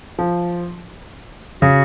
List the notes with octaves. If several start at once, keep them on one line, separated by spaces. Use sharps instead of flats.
F3
C#3 F#4